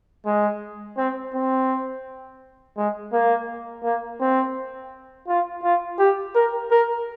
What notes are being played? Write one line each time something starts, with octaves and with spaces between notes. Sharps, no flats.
G#3
C4
C4
G#3
A#3
A#3
C4
F4
F4
G4
A#4
A#4